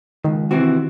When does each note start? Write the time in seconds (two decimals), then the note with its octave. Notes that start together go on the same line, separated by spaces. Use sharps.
0.24 C#2 D#3
0.51 C3 E3 C4 F#4